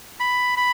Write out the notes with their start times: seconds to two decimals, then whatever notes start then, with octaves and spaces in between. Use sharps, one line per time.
0.20 B5
0.57 B5